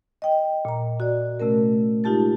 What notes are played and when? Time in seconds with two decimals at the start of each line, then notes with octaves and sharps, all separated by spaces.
0.22 D#5 G5
0.65 A#2 A#5
1.00 F#4 D5
1.40 C3 A3 C#4 A#4
2.04 G#3 D#4 F4 G4 A5 A6